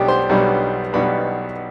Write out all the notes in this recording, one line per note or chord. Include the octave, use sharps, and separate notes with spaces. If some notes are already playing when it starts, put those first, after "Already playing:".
Already playing: B1 B2 G3 B3 D4 G4 G5
C5 C6
B1 B2 G3 B3 D4
B1 B2 G3 B3 D4 B4 B5